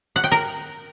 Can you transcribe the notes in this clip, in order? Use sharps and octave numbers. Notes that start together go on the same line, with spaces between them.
F#5
G5
A#4